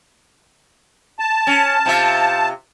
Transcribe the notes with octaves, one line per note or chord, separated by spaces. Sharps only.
A5
C#4
C3 F4 E5